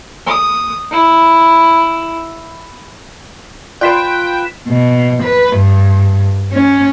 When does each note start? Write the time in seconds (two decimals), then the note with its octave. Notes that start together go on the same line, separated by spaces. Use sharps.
0.26 D#6
0.91 E4
3.81 F4 B4 D5 G5 C6 F#6 B6 E7
4.68 B2
5.24 B4
5.58 G2
6.53 C#4